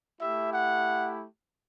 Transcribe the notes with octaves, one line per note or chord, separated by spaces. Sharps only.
A3 E4 G4 E5
F#5